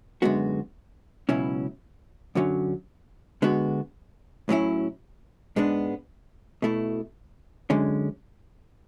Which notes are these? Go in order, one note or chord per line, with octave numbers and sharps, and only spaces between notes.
F#2 D3 G#3 B3 F#4
C#2 B2 F#3 C#4 E4
F#2 D3 F#3 C#4
D3 G#3 B3 F#4
A2 F#3 C#4 E4
G#2 G#3 B3 D4
B2 A3 E4
F#2 D3 G#3 C#4